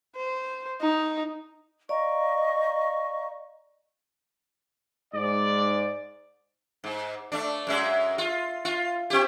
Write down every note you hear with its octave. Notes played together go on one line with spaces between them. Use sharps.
C5
D#4
D5 D#5 F5 A#5 C#6
G#2 D5
G#2
A3 D4
F#2 G#3 E5
F4
F4
C4 G4